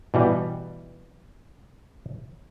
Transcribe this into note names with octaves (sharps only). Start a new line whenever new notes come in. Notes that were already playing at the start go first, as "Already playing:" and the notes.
B2 E3 G3